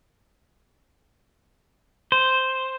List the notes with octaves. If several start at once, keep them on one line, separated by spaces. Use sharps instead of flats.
C5